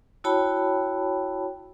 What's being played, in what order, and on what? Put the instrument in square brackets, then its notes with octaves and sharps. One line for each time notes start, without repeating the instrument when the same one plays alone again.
[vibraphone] E4 F#4 C#5 G5 A5 B5